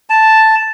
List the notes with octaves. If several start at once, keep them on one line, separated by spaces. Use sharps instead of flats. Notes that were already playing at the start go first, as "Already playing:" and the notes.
A5